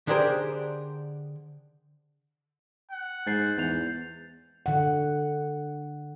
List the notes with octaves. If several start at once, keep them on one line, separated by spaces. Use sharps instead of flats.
D3 D4 G4 G#4 A#4 C5
F#5
G#2 G6 A6 C7
E2 G6 F7
D3 F#5